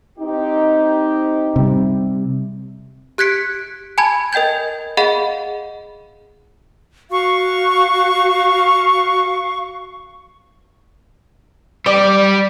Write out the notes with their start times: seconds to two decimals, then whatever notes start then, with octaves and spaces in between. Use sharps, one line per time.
0.19 C4 D#4 G4
1.56 C3 G3
3.18 G4 F#6 G#6 B6 C#7 D7
3.98 G#5 A5 B5 G#6
4.33 A#4 D#5 G5 G6 G#6
4.97 G#4 D#5 F5 F#5 B5
7.11 F#4 F5 C#6
11.86 G3 G4 D5